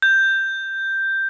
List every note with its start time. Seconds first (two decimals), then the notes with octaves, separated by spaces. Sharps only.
0.02 G6